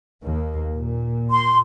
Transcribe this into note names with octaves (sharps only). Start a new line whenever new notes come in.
D#2 A#3
A#2
C6